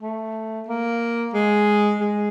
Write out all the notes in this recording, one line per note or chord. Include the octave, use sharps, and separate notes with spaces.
A3
A#3
G#3
G#3